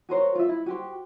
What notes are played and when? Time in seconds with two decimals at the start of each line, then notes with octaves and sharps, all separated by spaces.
0.09 F#4 A#4 C5 C#5
0.35 F4 E5
0.49 E4
0.66 F#4 G4 C5